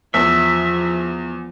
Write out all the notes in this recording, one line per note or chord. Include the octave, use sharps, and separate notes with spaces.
E2 F3 E5